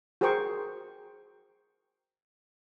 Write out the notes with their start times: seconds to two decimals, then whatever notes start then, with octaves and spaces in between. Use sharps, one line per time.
0.21 F#4 G#4 A#4 C5 G5 C#6